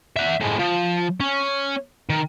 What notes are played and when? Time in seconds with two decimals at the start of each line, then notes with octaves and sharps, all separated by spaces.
0.16 E5 F#5
0.40 A2 G#3
0.59 F3
1.20 C#4
2.10 D#3